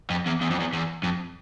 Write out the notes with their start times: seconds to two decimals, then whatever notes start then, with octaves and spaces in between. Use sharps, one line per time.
0.10 F2
0.26 E2
0.41 E2
0.50 F2
0.60 E2
0.73 E2
1.03 F2